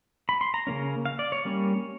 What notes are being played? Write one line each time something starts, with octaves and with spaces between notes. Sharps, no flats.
B5
C6
A#5
C#3 F3 A#3 C#4
F5
D5
C#5
G3 A#3 C#4